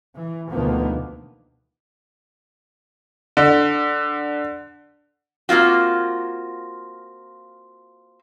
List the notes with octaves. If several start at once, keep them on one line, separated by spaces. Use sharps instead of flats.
E3
D2 B2 D#3 F3 A#3 B3
D3
A#3 C4 F4 F#4